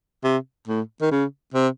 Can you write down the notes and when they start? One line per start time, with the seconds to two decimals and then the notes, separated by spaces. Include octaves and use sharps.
0.24 C3
0.68 A2
1.01 D#3
1.11 C#3
1.54 C3